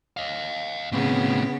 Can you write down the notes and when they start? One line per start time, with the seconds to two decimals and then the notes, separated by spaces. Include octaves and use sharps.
0.17 D#5 F5
0.92 A2 C#3 B3 C4